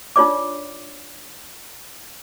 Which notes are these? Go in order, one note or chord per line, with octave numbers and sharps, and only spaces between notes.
D4 D#4 F4 C#5 D5 D6